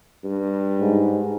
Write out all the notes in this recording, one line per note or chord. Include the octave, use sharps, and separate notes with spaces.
G2
G#2